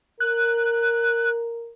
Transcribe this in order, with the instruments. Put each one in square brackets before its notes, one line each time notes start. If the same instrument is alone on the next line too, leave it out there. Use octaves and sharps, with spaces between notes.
[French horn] A#4 [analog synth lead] F#6